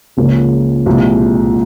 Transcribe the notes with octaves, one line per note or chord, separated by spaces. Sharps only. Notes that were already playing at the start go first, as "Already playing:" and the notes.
C#2 C#3 F3 A#3 F4
C2 A#2 F3 G#3